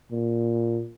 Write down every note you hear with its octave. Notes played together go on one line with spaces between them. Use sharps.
A#2